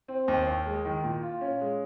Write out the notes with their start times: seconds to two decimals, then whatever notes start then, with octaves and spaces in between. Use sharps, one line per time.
0.08 C4
0.28 D#2
0.47 D#2
0.66 G#3
0.85 D#3
1.04 A#2
1.23 F4
1.41 C#4
1.61 G#3